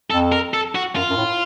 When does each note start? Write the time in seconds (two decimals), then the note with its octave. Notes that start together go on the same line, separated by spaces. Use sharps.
0.10 F2 A4
0.32 A#4
0.54 A4
0.75 F#4
0.96 F#2 F4
1.10 F#2
1.16 A2